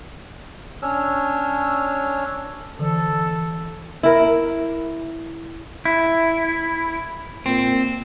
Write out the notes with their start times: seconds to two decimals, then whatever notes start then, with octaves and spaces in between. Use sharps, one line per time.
0.82 C#4 D4 C#5 E6 F6
2.79 D3 E3 A4
4.03 E4 A#4
5.85 E4
7.46 A#2 C4